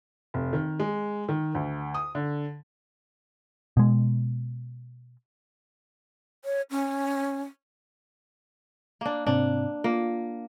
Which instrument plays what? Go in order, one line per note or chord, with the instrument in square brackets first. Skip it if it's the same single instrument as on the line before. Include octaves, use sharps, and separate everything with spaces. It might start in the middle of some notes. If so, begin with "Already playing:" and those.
[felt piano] F1
D#3
G#3
D#3
D2
D#6
D3
[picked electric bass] B2 G#3
[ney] C#5
C#4
[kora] A#3 D4
[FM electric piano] G#2 C3 C4 [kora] D4
[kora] A#3 [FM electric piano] F4